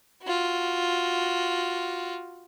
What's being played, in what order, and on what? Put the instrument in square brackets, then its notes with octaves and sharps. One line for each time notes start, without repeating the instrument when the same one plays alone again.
[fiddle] F4 F#4